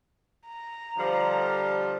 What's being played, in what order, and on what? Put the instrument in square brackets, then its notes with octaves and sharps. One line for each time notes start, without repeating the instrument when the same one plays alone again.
[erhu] A#5
[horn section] D3 F3 G3